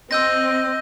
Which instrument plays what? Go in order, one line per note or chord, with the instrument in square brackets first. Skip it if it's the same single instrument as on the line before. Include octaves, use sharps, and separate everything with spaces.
[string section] C4 [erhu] D#5 [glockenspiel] E6 G6 A#6